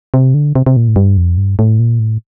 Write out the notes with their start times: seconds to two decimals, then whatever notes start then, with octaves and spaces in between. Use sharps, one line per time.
0.14 C3
0.34 D3
0.55 C3
0.66 C3
0.77 A#2
0.88 A2
0.96 G2
1.17 F2
1.37 G2
1.59 A2
1.79 A#2
1.99 A2